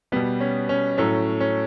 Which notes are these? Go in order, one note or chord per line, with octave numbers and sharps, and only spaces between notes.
B2 G3 B3
C#4
C#4
A2 F#3 A3 C#4
C#4